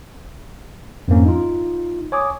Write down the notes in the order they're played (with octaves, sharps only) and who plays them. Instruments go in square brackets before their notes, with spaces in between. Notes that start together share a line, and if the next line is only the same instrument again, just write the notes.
[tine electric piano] F2 G#2 A#3 C#4
D#4 F4
C#5 G#5 D6 D#6